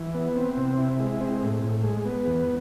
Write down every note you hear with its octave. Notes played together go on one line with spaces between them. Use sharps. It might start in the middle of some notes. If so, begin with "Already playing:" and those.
Already playing: E3
B3
C4
C3
E4
G#3
C4
A2
A2
G#3
B3
E2